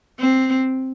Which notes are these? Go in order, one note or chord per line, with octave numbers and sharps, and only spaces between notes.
C4